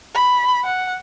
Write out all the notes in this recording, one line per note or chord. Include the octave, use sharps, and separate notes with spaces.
B5
F#5